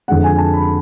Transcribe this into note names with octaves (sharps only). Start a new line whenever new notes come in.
F2 D3 G#3 F#5
G#5
A5
B5